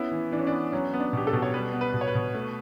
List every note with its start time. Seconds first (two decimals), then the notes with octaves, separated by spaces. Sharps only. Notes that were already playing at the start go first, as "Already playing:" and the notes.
Already playing: B3 C#4 E4
0.11 E3
0.32 E3 D4
0.39 C#4
0.47 D4
0.52 B3
0.72 F#3 C#4
0.94 B3
1.00 D4
1.13 B2 G4
1.27 A4
1.33 B2
1.42 C#5
1.54 G3 B4
1.73 B3
1.81 B4
1.94 B2
2.01 C#5
2.07 B4
2.15 B2
2.34 A3